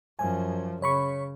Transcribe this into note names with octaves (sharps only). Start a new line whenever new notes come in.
F#2 F3 G#5
C#3 C#5 B5 C#6